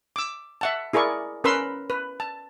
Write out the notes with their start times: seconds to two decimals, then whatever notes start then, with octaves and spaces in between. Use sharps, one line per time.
0.16 D6 E6
0.61 E5 F#5 A5
0.93 E4 G#4 A#4 D5 C#6
1.44 C#4 A#4 B4 B5 C6 E6
1.90 B4
2.20 A5